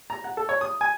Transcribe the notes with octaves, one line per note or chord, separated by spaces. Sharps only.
A#5
F#5
A4
C#5
D#6
G#5